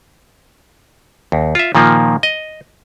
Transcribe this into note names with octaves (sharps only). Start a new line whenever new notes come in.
D#2
F4 E5
A#2 D#3 F3 A#3
D#5